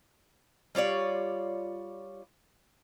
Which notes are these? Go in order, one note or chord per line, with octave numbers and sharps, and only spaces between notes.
G3 F4 C#5 D5